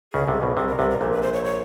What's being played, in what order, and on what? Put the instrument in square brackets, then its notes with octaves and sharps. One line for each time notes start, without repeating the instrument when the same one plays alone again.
[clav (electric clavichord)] C#2 C#3 [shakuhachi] G#4
[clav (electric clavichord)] C2 C3
B1 B2
[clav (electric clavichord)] C2 C3 [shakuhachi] G#4
[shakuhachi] A#4
[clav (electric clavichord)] C2 C3 [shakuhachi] B4
[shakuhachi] A#4
[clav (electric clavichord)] A#1 A#2 [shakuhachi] A4
[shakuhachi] B4
C5
C#5
C#5